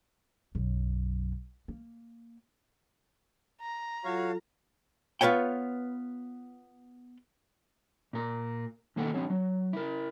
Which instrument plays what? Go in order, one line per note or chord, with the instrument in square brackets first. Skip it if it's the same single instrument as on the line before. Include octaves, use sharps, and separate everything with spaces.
[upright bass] B1 F#2
A#3
[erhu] A#5
[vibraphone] F#3 F4 A4 [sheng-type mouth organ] F#4 C#5 F5
[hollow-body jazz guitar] B3 F4 B4 C#5 G5
[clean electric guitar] A#2 A#4
B2 D#3 A#3 A4 F#5 G5
F3 C4 D4 C#5
F#3
E4 A#4